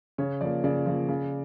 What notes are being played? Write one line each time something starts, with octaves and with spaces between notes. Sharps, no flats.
C#3 C#5
F3 A#3 D5
C#3 D5
F3 A#3
C#3